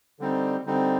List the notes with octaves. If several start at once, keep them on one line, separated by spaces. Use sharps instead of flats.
D3 G3 C4 D#4
D3 G3 C4 D#4